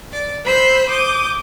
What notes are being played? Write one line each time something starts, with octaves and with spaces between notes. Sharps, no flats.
D5
C5 B5 E6 F#6
D6 D#6 G6